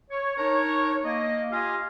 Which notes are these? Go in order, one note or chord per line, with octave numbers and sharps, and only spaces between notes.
C#5
D4 D#4 A#4 C#5
A#3 D#5
F4 G4 D#5 F5 G#5